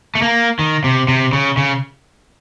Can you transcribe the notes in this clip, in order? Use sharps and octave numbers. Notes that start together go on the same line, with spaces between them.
A3
A#3
D#3
C3
C3
C#3
C#3